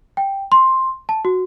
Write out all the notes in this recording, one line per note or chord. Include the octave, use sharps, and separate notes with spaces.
G5
C6
A5
F#4